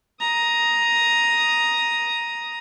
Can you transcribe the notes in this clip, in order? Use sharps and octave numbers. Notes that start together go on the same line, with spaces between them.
A#5 D#6